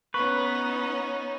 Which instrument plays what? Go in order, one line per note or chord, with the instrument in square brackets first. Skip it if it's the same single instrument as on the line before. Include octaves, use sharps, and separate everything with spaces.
[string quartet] B3 C#4 D#4 [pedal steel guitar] B4 [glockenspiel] C#6